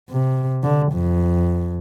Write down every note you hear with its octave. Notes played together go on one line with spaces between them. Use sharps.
C3
D3
F2